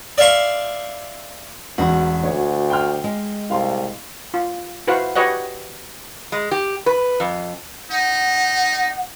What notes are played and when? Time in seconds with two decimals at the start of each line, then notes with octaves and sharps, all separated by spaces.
0.18 D5 E5 F5 C6 C#6
1.78 E1 A1 F#4
2.23 D2 C#5
2.70 G5 C6 F6
3.04 G#3
3.50 C2 F5 C6
4.34 F4
4.87 E4 F#4 B4 C5 F5 F#5
5.15 F#4 G4 B4 C#5 D#5 F#5
6.32 G#3
6.51 G4
6.86 B4
7.20 F2
7.91 D#4 F#5